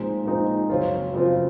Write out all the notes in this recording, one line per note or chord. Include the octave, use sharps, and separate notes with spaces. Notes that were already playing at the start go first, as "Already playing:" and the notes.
Already playing: A#2 F3 G#3 C4 D#4
A#2 F3 G#3 C4 D#4
F#2 C#3 F3 C4 F4
F#2 C#3 F3 C4 F4